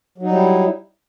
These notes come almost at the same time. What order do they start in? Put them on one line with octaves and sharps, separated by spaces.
F#3 D#4 G3 E4